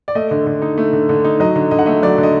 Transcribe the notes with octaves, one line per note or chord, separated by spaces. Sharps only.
D5
A3 D#5
D3
D3
D#4
A3
D3
D3
D#4
F#3 D#5
D3
D3 D#5
F#5
A3 D#5
F#3 D5
D3
D#5